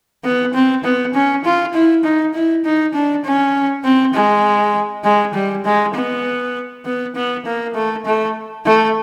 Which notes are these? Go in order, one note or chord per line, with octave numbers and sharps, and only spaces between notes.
B3
C4
B3
C#4
F4
E4
D#4
E4
D#4
D4
C#4
C4
G#3
G#3
G3
G#3
B3
B3
B3
A#3
A3
A3
A3